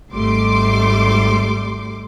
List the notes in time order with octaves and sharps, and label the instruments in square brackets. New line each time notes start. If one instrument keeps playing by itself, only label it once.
[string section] G#1 G3 A3 C6 D6